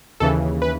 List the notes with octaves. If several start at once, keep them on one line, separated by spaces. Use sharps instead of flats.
D#2 C#3 E3 A4
B4